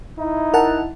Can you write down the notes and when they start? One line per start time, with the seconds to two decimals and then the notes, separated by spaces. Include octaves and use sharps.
0.18 D#4 E4
0.54 A#4 F#5 A5